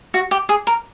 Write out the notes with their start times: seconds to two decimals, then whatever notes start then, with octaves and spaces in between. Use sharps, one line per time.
0.14 F#4
0.31 G4
0.49 G#4
0.67 A#4